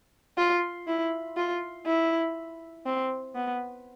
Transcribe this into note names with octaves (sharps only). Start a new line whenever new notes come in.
F4
E4
F4
E4
C4
B3